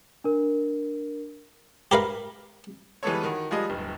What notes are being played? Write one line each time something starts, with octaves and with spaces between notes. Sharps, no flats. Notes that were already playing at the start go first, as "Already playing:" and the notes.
D4 A#4
G4 A#4 B4 F5
E3 G3 G#3 B3 A4 C#5
D#3 F#4
F3 G3 G#3 D#5
D1 G1